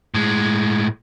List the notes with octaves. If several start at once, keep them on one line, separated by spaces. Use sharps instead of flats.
A2 G#3